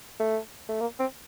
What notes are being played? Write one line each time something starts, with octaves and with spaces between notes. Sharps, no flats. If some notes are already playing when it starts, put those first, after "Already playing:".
A3
A3
A#3
C4